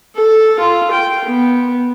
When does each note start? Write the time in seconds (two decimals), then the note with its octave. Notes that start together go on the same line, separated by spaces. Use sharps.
0.15 A4
0.59 F4
0.91 G5
1.24 B3